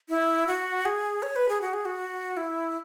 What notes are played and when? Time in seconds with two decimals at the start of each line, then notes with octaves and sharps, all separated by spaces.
0.09 E4
0.47 F#4
0.85 G#4
1.22 C#5
1.36 B4
1.49 G#4
1.61 F#4
1.73 G#4
1.85 F#4
2.37 E4